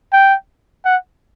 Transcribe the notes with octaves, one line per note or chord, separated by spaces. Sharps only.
G5
F#5